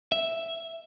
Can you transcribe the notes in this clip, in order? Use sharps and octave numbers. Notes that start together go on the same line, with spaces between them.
E5